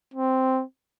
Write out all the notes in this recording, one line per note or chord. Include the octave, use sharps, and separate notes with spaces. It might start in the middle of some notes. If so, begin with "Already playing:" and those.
C4